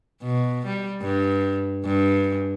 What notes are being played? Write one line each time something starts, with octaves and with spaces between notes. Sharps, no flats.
B2
G3
G2
G2